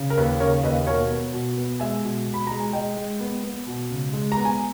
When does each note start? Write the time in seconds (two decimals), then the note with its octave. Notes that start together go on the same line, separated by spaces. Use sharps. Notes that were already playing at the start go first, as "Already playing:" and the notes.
Already playing: C#3
0.10 A#4
0.17 D#2 B4
0.40 C#3 A#4 C#5
0.63 D#2 B4 D#5
0.87 B2 A#4 C#5
1.11 B3
1.33 B2
1.57 B3
1.80 G#3 E5 G#5
2.04 B2
2.27 B2
2.34 B5
2.47 G#3 A#5
2.60 G#5
2.73 G#3 D#5 G5
2.96 G#3
3.20 B3
3.44 B3
3.66 B2
3.90 C#2
4.13 G#3
4.32 A#5
4.37 B3
4.45 G#5